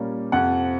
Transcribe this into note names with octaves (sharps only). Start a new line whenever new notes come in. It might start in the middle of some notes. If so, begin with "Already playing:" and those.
Already playing: A#2 G3 A#3 C#4
F2 C3 F3 F#5